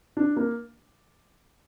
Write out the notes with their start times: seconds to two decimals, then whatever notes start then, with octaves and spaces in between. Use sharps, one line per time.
0.17 D4
0.37 A#3